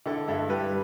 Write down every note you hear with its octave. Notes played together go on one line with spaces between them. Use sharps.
D3 E4 A4
G2 E4 A4
G3 G4 B4